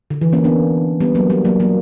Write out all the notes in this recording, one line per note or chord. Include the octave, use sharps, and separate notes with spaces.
D3
E3
A#3 C#4
B3 D4
G3 B3
F#3 A#3
G3
F#3 A#3
F#3 A#3